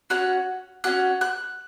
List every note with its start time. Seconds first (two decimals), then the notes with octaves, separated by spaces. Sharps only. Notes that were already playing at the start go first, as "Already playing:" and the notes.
0.10 C#4 F#4 F#6
0.84 C#4 F#4 F#6
1.21 F#6